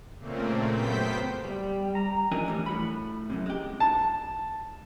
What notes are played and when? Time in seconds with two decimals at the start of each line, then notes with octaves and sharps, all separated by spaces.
0.19 A#2 C#3 A3 A#3 C4
0.70 F#2 B3 C5 G5 G6 B6
1.45 G3
1.95 A#5
2.31 E3 F3 D4 D#4 A#4 G#5
2.46 A2 E3 G3
2.66 A2 F#4 B5
3.30 F#2 A2 C3
3.46 G#3 G4
3.80 A5